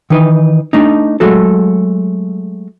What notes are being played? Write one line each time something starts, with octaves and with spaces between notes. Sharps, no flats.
D#3 E3 D#4 B4
A3 D4 D#4
F#3 G#3 A3 F#4 A4